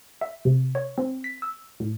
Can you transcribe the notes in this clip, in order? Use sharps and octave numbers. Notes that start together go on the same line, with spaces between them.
E5
C3
C#5
C4
B6
E6
A2